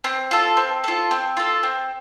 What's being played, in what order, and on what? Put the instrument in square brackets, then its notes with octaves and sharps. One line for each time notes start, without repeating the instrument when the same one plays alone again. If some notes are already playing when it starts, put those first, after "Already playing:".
[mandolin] C4
F4 A4
C4
F4 A4
C4
F4 A4
C4